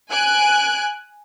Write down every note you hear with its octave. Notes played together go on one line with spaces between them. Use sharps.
G#5 F#6 D7